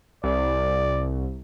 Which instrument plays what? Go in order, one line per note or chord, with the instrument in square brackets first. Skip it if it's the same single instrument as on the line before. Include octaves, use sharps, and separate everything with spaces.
[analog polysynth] C2 [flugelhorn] D5